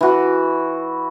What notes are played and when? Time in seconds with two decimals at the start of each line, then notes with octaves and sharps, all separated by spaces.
0.01 E3 F#4